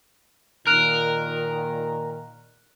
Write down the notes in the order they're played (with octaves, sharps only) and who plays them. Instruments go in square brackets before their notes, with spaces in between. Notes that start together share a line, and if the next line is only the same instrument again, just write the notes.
[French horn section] A#2 D#3 [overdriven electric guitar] A#4 [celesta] F6 F#6 F7